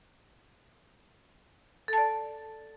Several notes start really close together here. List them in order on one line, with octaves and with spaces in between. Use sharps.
A4 A5 D5